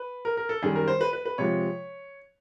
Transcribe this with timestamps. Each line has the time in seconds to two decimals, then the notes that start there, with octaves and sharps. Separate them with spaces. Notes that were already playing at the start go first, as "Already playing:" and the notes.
Already playing: B4
0.25 A#4
0.37 A#4
0.49 A4
0.62 F#2 D#3 G3 G#4
0.75 A#4
0.88 C5
1.01 B4
1.13 B4
1.25 B4
1.38 C3 F3 G#3 C#5